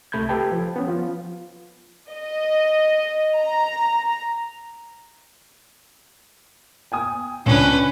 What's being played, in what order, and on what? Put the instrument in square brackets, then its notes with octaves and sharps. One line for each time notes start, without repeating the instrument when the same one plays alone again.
[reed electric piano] C2 C3 A3 B5 G6 G#6
G4 A4 B4 G5 A5
F3
B3 C#4
F3 F4
[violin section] D#5
A#5
[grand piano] G5 G#5 D#6
[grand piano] C#2 [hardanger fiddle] C#4 B4 [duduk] D4